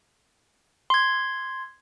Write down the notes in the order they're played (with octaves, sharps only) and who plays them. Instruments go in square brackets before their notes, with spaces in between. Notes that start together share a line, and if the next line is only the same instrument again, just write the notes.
[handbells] C6 G#6